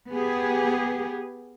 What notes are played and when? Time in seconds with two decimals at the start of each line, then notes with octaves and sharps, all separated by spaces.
0.11 B3 G4 G#4